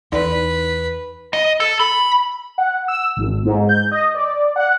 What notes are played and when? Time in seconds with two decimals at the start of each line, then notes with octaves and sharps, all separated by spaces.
0.12 E2 D#4 B4 D5
1.33 D#5
1.60 A4
1.80 B5
2.58 F#5
2.88 E6
3.17 G#1
3.45 G#2
3.69 G6
3.91 D#5
4.15 D5
4.56 F#5